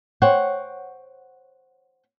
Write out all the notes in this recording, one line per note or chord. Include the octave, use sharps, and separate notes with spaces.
C5 C#5 F#5 G5